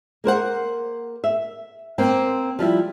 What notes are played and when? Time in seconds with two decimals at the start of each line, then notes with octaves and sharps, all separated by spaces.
0.24 A#3 A#4 C5 F#5
1.24 E5
1.98 A#3 C4 C5 G5
2.59 F3 G3 E4